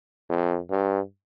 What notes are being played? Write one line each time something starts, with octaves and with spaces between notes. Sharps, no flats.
F2
G2